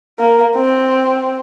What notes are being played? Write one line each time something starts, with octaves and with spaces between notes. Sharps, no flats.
A#3
C4